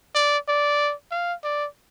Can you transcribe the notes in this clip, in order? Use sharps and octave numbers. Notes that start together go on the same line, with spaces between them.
D5
D5
F5
D5